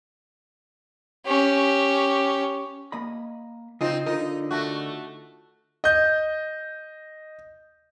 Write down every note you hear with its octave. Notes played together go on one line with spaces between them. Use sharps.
C#4 G4
A#3 D#5 B5
C#3 C4 D#4 F4
D3 D#4 F4 A#4
A3 F#4
D#5 G6